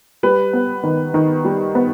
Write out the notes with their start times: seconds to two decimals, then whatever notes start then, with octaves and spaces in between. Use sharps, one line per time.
0.23 G3 B4
0.53 B3
0.83 D#3
1.14 D#3
1.45 G3
1.75 B3